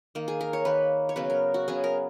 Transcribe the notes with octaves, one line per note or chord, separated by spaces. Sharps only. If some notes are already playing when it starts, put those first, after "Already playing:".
D#3 A#3
G#4
A#4
C#5
D#3 A#3 B4
C#5
C#3 F#3 B3 B4
A#4
F#4
C#3 F#3 B3 G#4
A#4